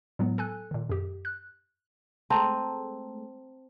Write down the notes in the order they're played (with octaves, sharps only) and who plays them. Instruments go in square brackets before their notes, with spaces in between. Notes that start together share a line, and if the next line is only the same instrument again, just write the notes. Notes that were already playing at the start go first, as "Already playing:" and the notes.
[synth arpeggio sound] A2 F#3 G#3 B3
A4 G#5 F#6
A#2 D#3
F#2 G4
F#6
[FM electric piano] G#3 A3 [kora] C4 [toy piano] A5 A#5